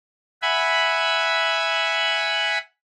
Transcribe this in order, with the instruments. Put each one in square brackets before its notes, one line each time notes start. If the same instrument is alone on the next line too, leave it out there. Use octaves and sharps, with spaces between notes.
[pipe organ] E5 F#5 G#5 B5